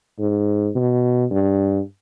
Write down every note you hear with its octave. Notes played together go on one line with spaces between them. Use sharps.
G#2
B2
G2